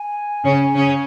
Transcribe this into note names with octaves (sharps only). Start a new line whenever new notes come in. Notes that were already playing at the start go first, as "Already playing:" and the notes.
Already playing: G#5
C#3 C#4
C#3 C#4